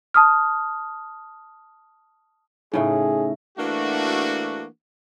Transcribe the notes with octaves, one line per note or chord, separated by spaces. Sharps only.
A5 D#6 F6
A2 C#3 D#4 G#4 E5
E3 A3 A#3 D4 F#4